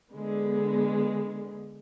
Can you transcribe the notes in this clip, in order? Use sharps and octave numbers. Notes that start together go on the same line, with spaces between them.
D3 G#3 B3